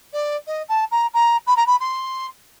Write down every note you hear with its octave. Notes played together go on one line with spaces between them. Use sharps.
D5
D#5
A5
A#5
A#5
B5
A#5
B5
C6